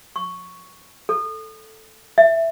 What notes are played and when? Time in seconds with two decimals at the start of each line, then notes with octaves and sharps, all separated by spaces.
0.16 C#6
1.09 A4
2.18 E5